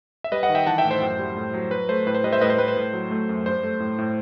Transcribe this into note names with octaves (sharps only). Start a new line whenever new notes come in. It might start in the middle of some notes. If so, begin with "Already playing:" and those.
E5
G3 B4 D#5
D#5 F#5
D#3
E5 G5
E3 F#5 A5
E5 G5
A2
C5
F#2
G3
A2
F#3
F#3 B4
A3 C5
A2 B4
C5
G3 B4 D#5
C5 E5
A2 B4 D#5
C5
A2 B4
C5
A2
F#3
A3
F#2
G2 C5
A3
A2
A2